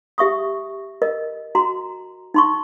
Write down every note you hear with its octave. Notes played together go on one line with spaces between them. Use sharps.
G4 E5 C#6 D#6
A#4 D#5
F#4 A#5 C6
D#4 C6 C#6